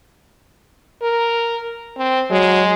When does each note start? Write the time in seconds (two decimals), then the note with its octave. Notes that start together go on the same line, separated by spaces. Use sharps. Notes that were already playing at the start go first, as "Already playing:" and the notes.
1.02 A#4
1.98 C4
2.31 F#3 G#3